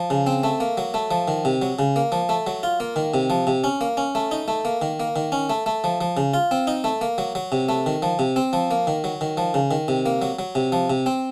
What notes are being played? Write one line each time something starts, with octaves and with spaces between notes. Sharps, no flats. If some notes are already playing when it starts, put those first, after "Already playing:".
Already playing: F3
C#3
C4
A3
A#3
F#3
A3
F3
D#3
C3
F#3
C#3
A#3
F3
A3
F#3
F4
A#3
D#3
C3
F3
C3
C#4
A#3
C#4
A3
D#4
A3
A#3
D#3
A#3
D#3
C#4
A3
A3
F3
F3
C#3
F4
C4
D#4
A3
A#3
F#3
F#3
C3
A3
D#3
F3
C3
C4
F3
A#3
D#3
F#3
D#3
F3
C#3
D#3
C3
A#3
F#3
F#3
C3
F3
C3
C4